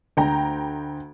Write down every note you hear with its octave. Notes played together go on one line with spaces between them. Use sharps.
D2 G5 A#5